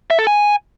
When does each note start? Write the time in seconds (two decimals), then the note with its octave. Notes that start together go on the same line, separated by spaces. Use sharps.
0.10 E5
0.19 A4
0.27 G#5